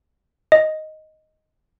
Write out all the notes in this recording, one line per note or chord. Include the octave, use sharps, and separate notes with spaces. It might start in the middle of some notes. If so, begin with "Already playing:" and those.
D#5